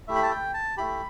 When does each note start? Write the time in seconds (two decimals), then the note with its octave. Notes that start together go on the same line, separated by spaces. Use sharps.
0.08 A3 E4 G4 E5
0.15 B5
0.23 A5
0.31 G5
0.54 A5
0.77 A3 E4 G4 B5